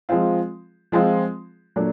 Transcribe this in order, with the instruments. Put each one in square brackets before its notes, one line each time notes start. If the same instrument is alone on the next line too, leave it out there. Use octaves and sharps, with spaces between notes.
[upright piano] F3 G#3 C4 F4
F3 G#3 C4 F4
A#2 F#3 A3 D4